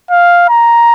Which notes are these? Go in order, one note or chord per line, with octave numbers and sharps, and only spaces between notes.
F5
A#5